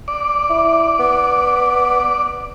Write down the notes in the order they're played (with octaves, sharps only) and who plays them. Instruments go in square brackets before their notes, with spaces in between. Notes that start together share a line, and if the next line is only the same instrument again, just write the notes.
[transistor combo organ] D5
[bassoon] E4
B3